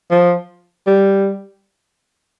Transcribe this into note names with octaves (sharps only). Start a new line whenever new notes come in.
F3
G3